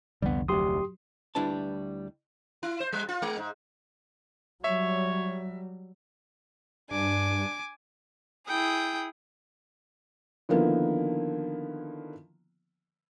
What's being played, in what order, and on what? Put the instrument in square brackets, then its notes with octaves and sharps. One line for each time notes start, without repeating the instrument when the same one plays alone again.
[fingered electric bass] C2 F2 D3 [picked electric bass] G3 B3
[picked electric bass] F1 D2 [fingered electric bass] F#3 [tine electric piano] G4 C6 D#6
[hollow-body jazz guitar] D2 G3 D4 E4 B4 A5
[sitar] E4
C5
G3
F4
G#3
G#2
[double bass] F#3 G3 [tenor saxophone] C#5 [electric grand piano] E5
[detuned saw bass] G2 [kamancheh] D4 [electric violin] G#5 D6
[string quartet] E4 G#4 D#6 [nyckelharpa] G5
[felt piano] D3 D#3 F3 A#3 B3 E4